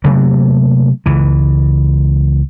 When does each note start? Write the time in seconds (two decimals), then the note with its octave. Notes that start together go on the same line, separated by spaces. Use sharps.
0.04 C3 F#3 A3 A#3
1.06 C#2 E3